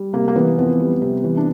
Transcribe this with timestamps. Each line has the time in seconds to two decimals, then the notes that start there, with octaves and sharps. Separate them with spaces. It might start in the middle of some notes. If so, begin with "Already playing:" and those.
Already playing: G3
0.13 C3 A#3
0.28 A#3
0.36 E3 B3
0.58 F2 B3
0.80 G3
1.02 C3
1.24 E3
1.37 D4